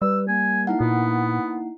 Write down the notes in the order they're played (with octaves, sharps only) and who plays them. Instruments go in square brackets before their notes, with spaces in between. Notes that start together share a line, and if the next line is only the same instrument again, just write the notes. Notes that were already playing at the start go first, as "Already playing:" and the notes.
[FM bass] G3 [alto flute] B4 [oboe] E6
[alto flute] A#3 [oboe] G#5
[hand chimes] D#4 E4 F#5
[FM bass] A#2 [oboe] B3